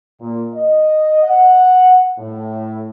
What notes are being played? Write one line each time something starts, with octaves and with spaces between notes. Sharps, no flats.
A#2
D#5
F#5
A2